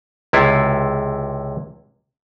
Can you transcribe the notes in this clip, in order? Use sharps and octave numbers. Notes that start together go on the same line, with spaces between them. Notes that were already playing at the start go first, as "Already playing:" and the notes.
C#2 C3 E4 F4